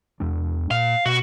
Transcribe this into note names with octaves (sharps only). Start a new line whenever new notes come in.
E2 G#3 D4
A#2 F5
B2 F#4